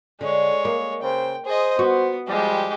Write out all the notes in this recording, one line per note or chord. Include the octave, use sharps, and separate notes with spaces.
D3 G#3 C#5
A#3
C#3 C5 G5
G#4 C5 D#5
B3 F#4
F3 G3 G#3 G4